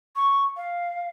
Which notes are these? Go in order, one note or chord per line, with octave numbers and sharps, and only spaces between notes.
C#6
F5